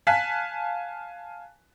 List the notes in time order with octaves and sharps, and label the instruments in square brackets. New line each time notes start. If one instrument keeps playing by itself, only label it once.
[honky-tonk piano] F5 G#5 A5 F#6 B6